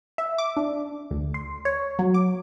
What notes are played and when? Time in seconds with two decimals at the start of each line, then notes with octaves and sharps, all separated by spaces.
0.18 E5
0.38 D6
0.57 D4
1.11 D2
1.34 C6
1.65 C#5
1.99 F#3
2.14 D6